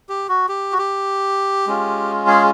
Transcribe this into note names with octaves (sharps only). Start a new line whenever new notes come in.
G4
F#4
G4
F#4
G4
G#3 C#4 F4
G#4